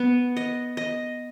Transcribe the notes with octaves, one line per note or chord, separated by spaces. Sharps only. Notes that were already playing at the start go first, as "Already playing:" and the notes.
Already playing: B3
D#5
D#5